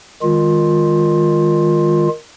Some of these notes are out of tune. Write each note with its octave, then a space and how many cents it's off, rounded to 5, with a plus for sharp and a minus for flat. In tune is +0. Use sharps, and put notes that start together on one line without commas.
D#3 +0 G#3 -25 F4 +15